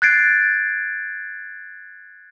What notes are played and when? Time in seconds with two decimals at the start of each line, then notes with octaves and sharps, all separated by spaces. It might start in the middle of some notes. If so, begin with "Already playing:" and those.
0.02 F#6 G#6 A6 C7 D7